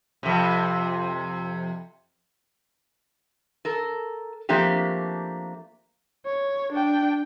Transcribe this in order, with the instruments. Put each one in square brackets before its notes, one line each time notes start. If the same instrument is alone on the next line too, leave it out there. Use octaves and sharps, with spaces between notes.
[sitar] F2 C3
[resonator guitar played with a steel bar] A4 A#4
F3 A3 A#3 C4 D4 G4
[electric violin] C#5
D4 G5